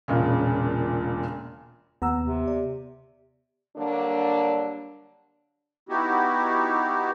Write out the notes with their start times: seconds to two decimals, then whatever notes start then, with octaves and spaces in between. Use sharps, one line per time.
0.08 E1 A#2 C#3
2.02 D#2 B3 F#5 A#5 E6
2.24 C3
2.47 D5
3.77 D3 F#3 G3 A#3 D4
5.89 B3 D#4 E4 F#4 G4